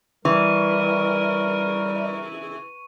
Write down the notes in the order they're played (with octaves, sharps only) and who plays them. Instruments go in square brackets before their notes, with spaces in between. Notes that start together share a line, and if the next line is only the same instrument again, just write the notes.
[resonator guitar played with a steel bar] E3 [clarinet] G3 [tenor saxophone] A#4 [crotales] C#6